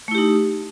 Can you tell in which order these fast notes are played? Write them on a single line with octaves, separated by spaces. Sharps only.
A3 E4 G4 D#4